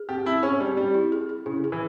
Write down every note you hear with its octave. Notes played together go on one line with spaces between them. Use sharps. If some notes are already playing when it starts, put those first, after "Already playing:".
Already playing: G#4
C4 G4
C4 E4
C#4 G#4
G3 C4
G3 C4
E4
G#4
G#4
C#3 E4
G#4
E3